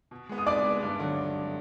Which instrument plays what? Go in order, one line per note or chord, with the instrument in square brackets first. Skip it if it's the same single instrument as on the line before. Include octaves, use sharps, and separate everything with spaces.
[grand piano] B2
G#3 B3
[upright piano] D#6
[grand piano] B2 [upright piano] D5 D6
[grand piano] G#3 B3
G2
D3 F#3